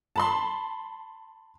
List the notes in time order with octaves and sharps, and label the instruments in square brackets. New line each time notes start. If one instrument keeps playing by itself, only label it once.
[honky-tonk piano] A5 B5 C6